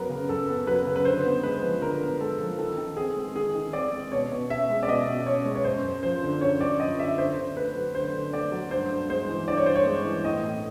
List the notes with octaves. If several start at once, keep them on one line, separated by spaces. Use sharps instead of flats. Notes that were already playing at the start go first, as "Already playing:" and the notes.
Already playing: F#2 F#3 B3 A#4 B4
C#3
F#2 A4
B3
F#3 B4
C#3
B4
D3 C5
B3
G#3 B4
F3
D3 A#4
B3
G#3 A4
F3
D#3 A4
D#3
C4 G#4
G#3
D#3 G#4
D#3
C4 D5
G#3
B2 C#5
B2
C#4 E5
G#3
D5
B2 D#5
B2
C#4 C#5
G#3
C#5
F#2 C5
F#2
F3 C5
D3
F#2 C#5
F#2 D5
F3 D#5
D3 E5
D3 C5
D3
A3 B4
F#3
D3 C5
D3
A3 D5
F#3
G2 C5
G2
G#3 C5
E3
G2 D5
C#5
G2 C5
C#5
G#3
E3
A2 D#5
A2